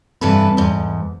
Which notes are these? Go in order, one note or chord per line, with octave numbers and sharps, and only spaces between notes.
G2 C3 E3 A4 B4
E2 G#2